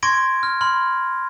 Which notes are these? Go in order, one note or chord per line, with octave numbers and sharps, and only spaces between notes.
C6 C#6 G#6 A#6 D7
F6
B5 C6 F6